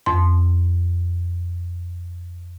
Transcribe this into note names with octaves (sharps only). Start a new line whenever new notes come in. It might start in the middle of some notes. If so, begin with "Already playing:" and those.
F2 C6